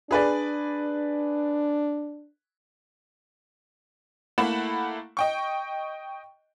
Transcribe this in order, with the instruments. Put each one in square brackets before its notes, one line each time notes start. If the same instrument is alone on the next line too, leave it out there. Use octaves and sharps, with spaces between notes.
[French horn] D4 [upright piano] G#4 B4 D5
[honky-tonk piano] A3 A#3 E4 F#5 B5 E7
D#5 G5 C#6